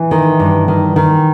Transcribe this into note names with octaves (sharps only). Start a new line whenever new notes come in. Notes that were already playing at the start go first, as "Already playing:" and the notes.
Already playing: E3
D#3
G2
D#3
D#3